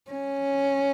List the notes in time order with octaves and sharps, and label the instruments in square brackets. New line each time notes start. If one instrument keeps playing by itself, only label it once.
[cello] C#4